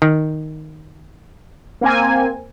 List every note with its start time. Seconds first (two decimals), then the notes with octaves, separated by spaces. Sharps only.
0.02 D#3
1.81 A#3 C4 G#5